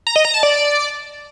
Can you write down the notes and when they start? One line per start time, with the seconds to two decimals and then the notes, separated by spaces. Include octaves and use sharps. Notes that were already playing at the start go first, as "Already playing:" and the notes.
0.07 A#5
0.16 D#5
0.25 A#5
0.34 A5
0.43 D5